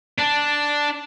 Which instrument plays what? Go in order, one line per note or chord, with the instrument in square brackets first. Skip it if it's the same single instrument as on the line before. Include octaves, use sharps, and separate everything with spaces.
[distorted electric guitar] D4